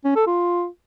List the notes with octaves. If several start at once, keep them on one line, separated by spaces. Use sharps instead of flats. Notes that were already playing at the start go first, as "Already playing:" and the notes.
C#4
A4
F4